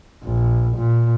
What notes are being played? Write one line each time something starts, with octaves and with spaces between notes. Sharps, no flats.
A#1
A#2